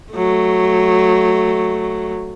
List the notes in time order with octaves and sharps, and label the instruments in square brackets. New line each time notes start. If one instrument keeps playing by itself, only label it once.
[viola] F#3 A3